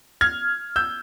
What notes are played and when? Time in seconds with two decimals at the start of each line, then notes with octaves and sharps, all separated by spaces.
0.21 F6 G#6
0.76 E6 G6